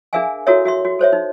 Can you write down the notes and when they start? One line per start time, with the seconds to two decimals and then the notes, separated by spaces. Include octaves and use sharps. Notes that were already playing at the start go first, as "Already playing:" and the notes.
0.13 D4 G#4 A#4 E5 F5 G#5
0.47 E4 F#4 A4 A#4 C#5 E5
0.65 F#4 E5 C6
0.85 F#4
0.99 A4 C5 C#5 E5
1.13 D#4